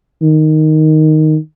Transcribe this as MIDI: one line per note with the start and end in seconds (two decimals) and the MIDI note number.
0.22 1.37 51